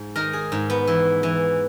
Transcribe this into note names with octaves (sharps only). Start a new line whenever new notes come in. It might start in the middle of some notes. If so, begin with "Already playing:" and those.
Already playing: G#2
D#3 A#4
G#4
G#2
B3
E3
E3